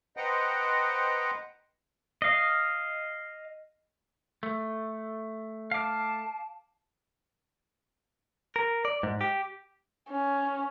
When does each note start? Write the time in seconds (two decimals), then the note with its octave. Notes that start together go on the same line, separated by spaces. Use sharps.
0.17 B4 C5 D#5 F#5 G5 A#5
2.22 D#5 F5
4.43 A3
5.71 F5 A5 D6
8.56 A#4
8.85 D5
9.03 G#2
9.21 G4
10.10 C#4